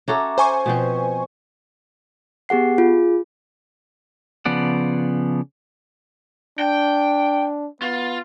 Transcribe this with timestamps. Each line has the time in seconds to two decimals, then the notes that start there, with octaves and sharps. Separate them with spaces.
0.08 C#4 F#4 A4 E5 A#5 D6
0.38 C5 G#5 C#6
0.66 B2 F3 C4 B4
2.49 B3 G4 G#4 F#5 C7
2.78 F4 G#4
4.45 C#3 F3 B3 D5 F#5
6.59 D4 G5
7.82 B3 F4